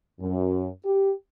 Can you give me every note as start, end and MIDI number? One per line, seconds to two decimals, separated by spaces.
0.20 0.68 42
0.84 1.11 67